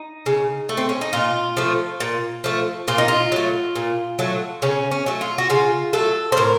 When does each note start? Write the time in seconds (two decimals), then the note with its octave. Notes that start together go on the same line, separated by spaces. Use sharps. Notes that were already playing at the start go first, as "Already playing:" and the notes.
Already playing: D#4
0.26 C#3
0.69 A3
0.77 C4
0.89 C#4
1.01 D#4
1.13 A#2 F4
1.57 F3 A3
2.00 A#2
2.44 F3 A3
2.88 A#2 F4
2.98 D#4
3.08 F4
3.32 F#3 A3
3.76 A#2
4.19 F#3 A3
4.62 C#3 C#4
4.91 C#4
5.06 F#3 A3
5.21 F4
5.38 F#4
5.50 C#3 F4
5.93 F#3 A3 A4
6.32 C5
6.37 A2 A#4